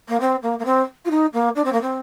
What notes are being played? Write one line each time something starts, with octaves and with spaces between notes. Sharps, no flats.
A#3
C4
A#3
A#3
C4
F4
D#4
A#3
D4
C4
A#3
C4